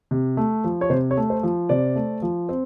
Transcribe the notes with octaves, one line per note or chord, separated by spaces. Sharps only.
C3
A3
F3
C#5
C3 C5
C#5
A3
C5
F3
C3 C5 D5
A3
F3
C4